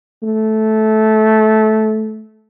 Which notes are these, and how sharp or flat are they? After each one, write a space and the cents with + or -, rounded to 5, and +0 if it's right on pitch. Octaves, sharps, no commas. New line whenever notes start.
A3 -15